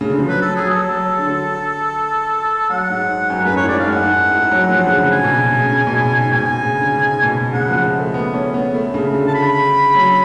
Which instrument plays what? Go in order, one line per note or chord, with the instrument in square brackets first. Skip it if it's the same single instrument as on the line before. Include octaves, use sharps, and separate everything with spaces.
[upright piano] C#3
D3
F3
[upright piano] F#3 [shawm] B4
[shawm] A4
[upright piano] F#3 [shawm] G#4
[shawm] A4
[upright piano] F#3
D3
[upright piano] F#3 [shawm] F#5
[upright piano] G#2
F#2
F#2
[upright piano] G#2 [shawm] B4
[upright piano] A2 [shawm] C#5
[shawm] D5
[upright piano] G#2
[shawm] F5
[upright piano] G#2
[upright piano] F#2 [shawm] F#5
[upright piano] G#2
A2
F#3
F3
C#3
D3
[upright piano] C#3 [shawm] G#5
[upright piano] B2
C#3
C#3
C#3
B2
G#2
G#2
[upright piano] B2 [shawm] G#5
[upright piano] C#3
D3
G#2
B2
[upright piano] C#3 [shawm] F#5
[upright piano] F3
G#3
A3
B3
C#4
B3
A3
C#3
D3
[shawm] A5
[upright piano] D3 [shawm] B5
[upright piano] F#3